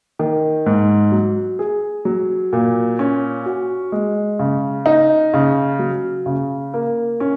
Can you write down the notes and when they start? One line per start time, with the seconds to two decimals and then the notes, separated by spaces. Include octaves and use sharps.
0.19 D#3
0.66 G#2
1.12 F#3
1.59 G#4
2.05 F#3
2.53 A#2
2.99 C#4
3.46 F#4
3.92 G#3
4.39 C#3
4.86 D#4
5.33 C#3
5.79 F#3
6.26 C#3
6.74 A#3
7.20 C#4